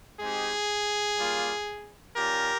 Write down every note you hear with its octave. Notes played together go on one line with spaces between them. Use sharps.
G#3 C4 D#4 G4 G#4
G3 A#3 F4
G3 C#4 F4 G4 A#4